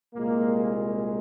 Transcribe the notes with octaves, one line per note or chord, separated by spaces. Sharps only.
C2 A#2 G#3 A#3